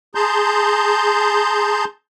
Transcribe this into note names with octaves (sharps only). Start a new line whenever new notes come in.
G#4 A5 A#5 C6 G6